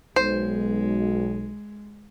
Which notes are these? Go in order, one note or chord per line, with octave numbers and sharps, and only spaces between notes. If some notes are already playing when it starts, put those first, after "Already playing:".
B1 G#3 C5